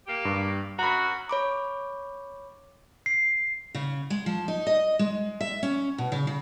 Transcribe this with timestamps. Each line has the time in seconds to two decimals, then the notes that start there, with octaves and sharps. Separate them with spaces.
0.07 A#3 G4
0.25 G2
0.79 F#2 F#4 A#5 B5
1.29 C#5 B5 D6
3.06 C7
3.75 C#3
4.10 G#3
4.26 F3
4.48 D#4
4.67 D#5
4.99 G#3
5.41 E5
5.63 C#4
5.98 B2
6.12 C#3
6.27 C#3